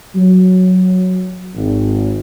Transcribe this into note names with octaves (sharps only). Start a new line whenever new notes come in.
F#3
G#1